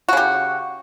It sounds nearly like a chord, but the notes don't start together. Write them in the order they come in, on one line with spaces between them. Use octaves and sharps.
F#4 C#3 G4